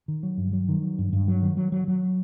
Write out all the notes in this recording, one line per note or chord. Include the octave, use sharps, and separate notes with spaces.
D#3
F#3
G2
F#3
D#3
F#3
G2
G2
F#3
D#3
F#3
F#3
F#3